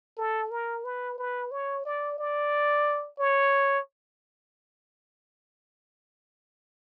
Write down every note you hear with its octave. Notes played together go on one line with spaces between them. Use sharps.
A4
A#4
B4
B4
C#5
D5
D5
C#5